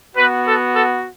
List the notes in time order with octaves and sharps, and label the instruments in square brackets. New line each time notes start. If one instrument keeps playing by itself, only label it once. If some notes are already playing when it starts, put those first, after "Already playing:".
[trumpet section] B3 F#4 B4
A4
A4